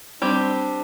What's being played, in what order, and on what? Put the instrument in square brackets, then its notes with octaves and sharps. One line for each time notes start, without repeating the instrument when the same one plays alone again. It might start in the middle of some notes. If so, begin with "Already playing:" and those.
[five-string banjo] G3 C4 G4 [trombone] D4